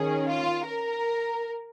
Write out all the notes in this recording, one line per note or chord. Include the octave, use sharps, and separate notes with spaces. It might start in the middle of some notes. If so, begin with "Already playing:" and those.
Already playing: D#3 C#4 G#4
F4
A#4